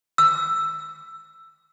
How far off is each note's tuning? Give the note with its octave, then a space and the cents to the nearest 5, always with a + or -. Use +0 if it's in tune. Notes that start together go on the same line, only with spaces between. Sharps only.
E6 +10